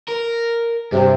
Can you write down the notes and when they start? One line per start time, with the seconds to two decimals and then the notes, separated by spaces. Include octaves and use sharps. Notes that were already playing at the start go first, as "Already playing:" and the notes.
0.08 A#4
0.92 G2 C3